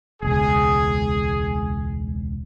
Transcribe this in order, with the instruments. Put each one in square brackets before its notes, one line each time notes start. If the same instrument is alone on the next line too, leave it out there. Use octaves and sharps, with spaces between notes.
[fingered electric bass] E1 C#2 [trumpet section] G#4